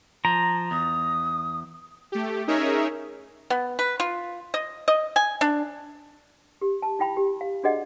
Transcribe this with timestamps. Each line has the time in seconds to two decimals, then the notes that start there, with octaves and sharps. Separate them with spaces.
0.25 F3 A#5
0.71 E2 D#6
2.12 A3 G4
2.47 C#4 D#4 G#4 A#4 C#5 E5
3.50 B3
3.79 B4
4.00 F4
4.54 D#5
4.88 D#5
5.16 G#5
5.41 D4
6.61 G4
6.82 A5
6.99 E4 F4 G5 B5
7.17 G4
7.41 F5
7.63 D4 F#4 G#4 D5 D#5 F#5